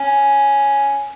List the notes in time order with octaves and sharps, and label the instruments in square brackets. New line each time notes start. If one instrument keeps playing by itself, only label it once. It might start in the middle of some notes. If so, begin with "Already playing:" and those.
Already playing: [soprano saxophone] C#4